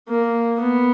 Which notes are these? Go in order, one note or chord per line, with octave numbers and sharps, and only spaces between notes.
A#3
B3